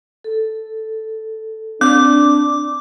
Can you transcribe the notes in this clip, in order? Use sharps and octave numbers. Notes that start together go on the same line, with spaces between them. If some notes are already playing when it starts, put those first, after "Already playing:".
A4
C4 D4 D6